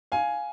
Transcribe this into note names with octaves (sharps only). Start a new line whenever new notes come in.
F5 G#5